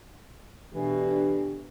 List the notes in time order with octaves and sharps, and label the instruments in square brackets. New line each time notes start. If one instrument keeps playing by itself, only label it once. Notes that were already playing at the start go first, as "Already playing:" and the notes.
[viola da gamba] B2 A3 [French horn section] D3 D4 G4 [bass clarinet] E3